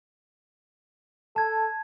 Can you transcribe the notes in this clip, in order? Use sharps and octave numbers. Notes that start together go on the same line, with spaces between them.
A4 A5 G#6